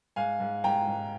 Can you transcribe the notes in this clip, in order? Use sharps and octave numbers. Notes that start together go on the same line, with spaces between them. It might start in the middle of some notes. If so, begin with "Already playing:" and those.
G#2 F5 G#5
G#2
G#2 G5 A#5
G#2